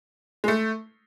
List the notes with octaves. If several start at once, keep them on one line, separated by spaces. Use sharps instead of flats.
G#3
A3